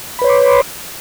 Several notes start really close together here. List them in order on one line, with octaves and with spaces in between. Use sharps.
B5 B4 C#5 C6 D6